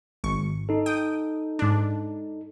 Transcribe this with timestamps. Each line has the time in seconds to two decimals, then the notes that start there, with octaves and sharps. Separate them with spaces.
0.24 G#1 C#6
0.69 D#4 A4
0.86 G5 D#6
1.59 G#2 D4